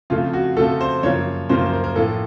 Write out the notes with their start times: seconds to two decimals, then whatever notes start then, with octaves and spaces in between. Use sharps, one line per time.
0.10 F2 C#3 F3 A3 F4
0.33 F#4
0.57 F2 C#3 F3 A3 A4
0.81 C5
1.03 F#2 C#3 F3 A#3 C#5
1.49 F#2 C#3 F3 A#3 C5
1.65 C5
1.73 A#4
1.84 A#4
1.96 A2 F3 A#3 A4